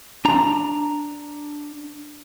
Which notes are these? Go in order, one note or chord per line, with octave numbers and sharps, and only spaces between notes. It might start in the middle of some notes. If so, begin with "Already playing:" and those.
D4 A#5